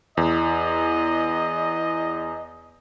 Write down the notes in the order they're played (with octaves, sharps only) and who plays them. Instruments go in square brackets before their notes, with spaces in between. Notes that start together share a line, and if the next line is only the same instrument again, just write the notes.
[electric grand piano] E2 [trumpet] D#5